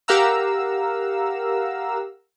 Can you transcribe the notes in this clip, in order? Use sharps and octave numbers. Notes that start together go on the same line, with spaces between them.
G4 A#4 F5 F#5 A#5 E6